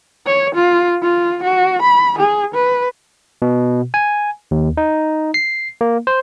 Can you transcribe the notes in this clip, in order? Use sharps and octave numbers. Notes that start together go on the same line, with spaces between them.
C#5
F4
F4
F#4
B5
G#4
B4
B2
G#5
D#2
D#4
C7
A#3
C5